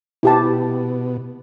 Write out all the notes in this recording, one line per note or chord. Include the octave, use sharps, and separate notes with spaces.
B2 E4 G4 A5